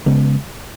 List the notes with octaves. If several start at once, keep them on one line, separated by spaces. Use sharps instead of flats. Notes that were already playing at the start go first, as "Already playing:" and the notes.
C#3 G#3 B3